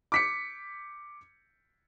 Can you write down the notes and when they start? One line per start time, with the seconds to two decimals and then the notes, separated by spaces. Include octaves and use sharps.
0.12 D6 B6 C#7